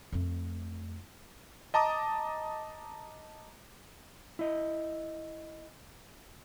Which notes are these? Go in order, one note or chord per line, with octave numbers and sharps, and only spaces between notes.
F2 A3
D#5 A5 A#5 D6 D#6
E4 D#5